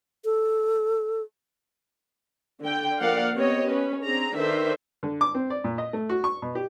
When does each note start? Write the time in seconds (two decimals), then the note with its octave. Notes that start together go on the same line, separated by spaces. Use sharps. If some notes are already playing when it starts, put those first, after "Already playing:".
0.25 A4
2.62 D3 G5
3.00 F3 A#3 A#4 D5 F5 F#5
3.33 B3 C4 G4 C#5 D#5
3.67 C#4 B4
4.02 C4 D4 G#4 A#5
4.38 D#3 D4 A4 B4 C5 E5
5.03 D3
5.21 D6
5.35 C4
5.50 D5
5.64 A#2
5.78 D#5
5.93 A3
6.09 F#4
6.24 C#6
6.42 B2
6.55 G4